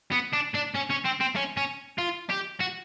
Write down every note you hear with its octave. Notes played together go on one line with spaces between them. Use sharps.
B3
D4
D4
C#4
C#4
C4
C4
C#4
C#4
F4
G4
F#4